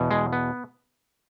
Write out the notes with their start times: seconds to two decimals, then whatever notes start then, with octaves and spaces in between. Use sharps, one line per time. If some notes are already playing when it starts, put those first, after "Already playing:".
Already playing: E2 B2
0.11 G#3
0.33 B3